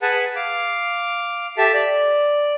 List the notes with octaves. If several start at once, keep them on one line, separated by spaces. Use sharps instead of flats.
G#4 B4 F#5 G#5 A5
F5 D6
G4 A4 E5 A5
D5